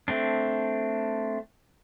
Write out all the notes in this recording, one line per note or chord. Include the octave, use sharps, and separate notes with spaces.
A3 C4 D4